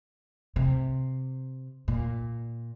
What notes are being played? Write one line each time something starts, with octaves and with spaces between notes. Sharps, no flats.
C3
A#2